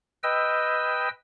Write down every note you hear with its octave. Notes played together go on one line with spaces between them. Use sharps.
B4 D#5 G5 E6